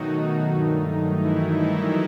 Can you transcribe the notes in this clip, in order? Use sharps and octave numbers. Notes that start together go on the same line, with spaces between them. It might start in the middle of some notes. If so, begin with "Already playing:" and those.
Already playing: B2 D#3 F#3 A3 D#4 F#4
G2 F#3 A3
E3 E4
E3 E4